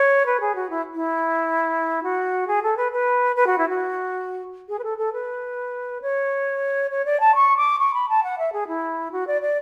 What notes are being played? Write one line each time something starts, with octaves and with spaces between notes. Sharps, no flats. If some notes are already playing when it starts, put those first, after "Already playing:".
Already playing: C#5
B4
G#4
F#4
E4
E4
F#4
G#4
A4
B4
B4
B4
F#4
E4
F#4
G#4
B4
A4
A4
B4
C#5
C#5
D5
A5
C#6
D6
C#6
B5
A5
F#5
E5
G#4
E4
F#4
D5
D5